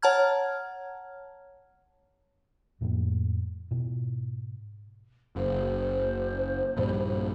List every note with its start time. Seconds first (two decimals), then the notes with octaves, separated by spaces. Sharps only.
0.02 C#5 F#5 A5 A#5 F6 G#6
2.81 F2 A2 F3 A#3
3.71 G#2 B2
5.36 F#1 C5
6.77 A#1 G2 G3